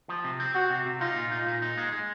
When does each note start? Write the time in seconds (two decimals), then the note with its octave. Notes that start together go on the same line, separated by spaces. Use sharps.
0.09 F3
0.24 C3
0.40 C4
0.55 C4 F#4
0.70 C3
0.85 C3
1.00 D#4 F4
1.16 A#2
1.32 D#4
1.47 A#2
1.62 D#4
1.78 G#3
1.92 G#3